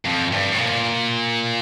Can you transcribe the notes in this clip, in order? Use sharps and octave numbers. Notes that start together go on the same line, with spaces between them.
F2
G2
A2
A#2